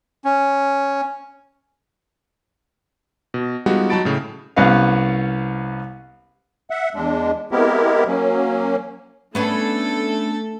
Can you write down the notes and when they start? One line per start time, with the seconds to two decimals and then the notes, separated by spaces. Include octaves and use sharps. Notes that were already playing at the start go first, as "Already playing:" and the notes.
0.25 C#4
3.34 B2
3.66 G3 G#3 B3 D#4 F4 F#4
3.90 F#3 D#4 A5 B5 A6 D7
4.05 A2 C#3
4.56 C2 B3 C#4 B4 F5
6.70 E5 F#5
6.95 E2 G#3 D4
7.51 G#3 B3 C4 E4 G4 A#4
8.07 F#3 A#3 C#4
9.35 A3 B3 C#4 D4 A4